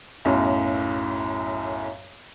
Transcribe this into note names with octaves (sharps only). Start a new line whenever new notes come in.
B1 F#2 A2